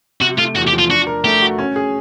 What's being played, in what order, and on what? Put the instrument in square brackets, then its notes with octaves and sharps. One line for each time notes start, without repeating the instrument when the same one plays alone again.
[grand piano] C3 [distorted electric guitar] F#4
[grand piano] A3 [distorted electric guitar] F4
[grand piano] E2 [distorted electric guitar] F#4
[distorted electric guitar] G4
[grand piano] F3
[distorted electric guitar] F4
[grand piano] D4 [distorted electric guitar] F#4
[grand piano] A#4
[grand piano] A3 [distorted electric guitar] G4
[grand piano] F#4
C#4
G#4